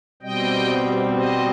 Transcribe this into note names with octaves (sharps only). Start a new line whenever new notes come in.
B2 G3 C4 D#5 G5
C5 D#5